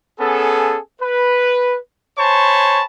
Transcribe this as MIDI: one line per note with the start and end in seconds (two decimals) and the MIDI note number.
0.19 0.77 59
0.19 0.77 61
0.19 0.77 68
0.19 0.77 69
1.01 1.77 71
2.18 2.82 72
2.18 2.82 73
2.18 2.82 80
2.18 2.82 81
2.18 2.82 83
2.18 2.82 85